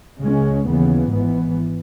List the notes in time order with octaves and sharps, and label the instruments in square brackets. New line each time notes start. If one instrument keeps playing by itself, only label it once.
[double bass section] C#2 C#3 G#3 C#4
D#2 C#3 E3 B3
G#1 G#2 E3 B3